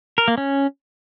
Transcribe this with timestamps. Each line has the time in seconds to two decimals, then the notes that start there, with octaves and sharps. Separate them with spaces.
0.18 A#4
0.28 A#3
0.38 C#4